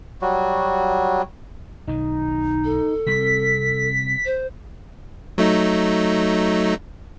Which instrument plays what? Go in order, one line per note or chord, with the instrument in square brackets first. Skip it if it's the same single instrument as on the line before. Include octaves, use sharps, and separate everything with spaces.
[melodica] F#3 G3 F#4
[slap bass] B1 D#3 [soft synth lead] D#4
[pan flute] A4
[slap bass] C3 G3 C4 [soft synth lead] B6
[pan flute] C5
[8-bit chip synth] F#3 A3 D#4